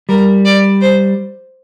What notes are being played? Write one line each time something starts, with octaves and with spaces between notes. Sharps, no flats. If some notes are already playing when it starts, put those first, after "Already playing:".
G3 A#4
D5
C5